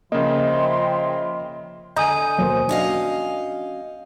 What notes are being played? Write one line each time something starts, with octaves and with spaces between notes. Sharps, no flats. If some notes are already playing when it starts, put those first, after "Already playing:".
C#3 F3 A#3 D#5 E5 G5 C6
D3 D#5 G#5 A#5 D#6 G6
D#2 B2 F#3 A#3 C5
C#4 D4 F#4 D#5 F5